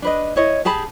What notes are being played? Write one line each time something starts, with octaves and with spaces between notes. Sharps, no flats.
D4 B4 D#5
E4 C#5 D#5
G4 G#4 A5 B5